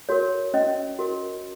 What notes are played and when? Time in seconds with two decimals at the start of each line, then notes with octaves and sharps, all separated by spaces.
0.09 F#4 A#4 C#5
0.54 C#4 D#5
0.99 F#4 A#4